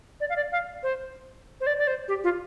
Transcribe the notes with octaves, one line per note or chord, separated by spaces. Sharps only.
D5
F5
D5
F5
C5
C5
D5
D5
C5
G4
F4